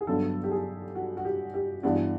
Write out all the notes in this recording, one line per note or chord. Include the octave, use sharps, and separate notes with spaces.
G#4
G2 D3 F#3 B3 A4
G4
G#4
F#4
F#4
G4
G4
G2 E3 G#3 B3 D4 F#4